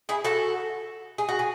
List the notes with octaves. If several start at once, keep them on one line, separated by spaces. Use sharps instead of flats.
E4 G#4
F#4 A4
G#4
F#4
G#4